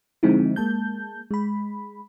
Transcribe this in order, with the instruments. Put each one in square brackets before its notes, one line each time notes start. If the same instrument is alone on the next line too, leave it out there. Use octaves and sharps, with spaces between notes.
[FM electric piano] D3 F3 G#3 C4 D#4 E4
G#3 A#3 A5 G6
G#3 B5